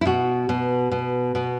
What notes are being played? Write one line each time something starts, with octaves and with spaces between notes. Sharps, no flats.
E4
B2 F#4
B2
B2
B2